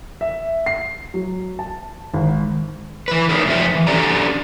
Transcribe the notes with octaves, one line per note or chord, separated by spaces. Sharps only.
E5
C7
F#3
A5
G#1
E3 B4
A3 C#4 D#4 G#4 A#4 B4
F2 G#3 C4 F4 E5
E3
C#4 D4 G4 A4 D5 A#5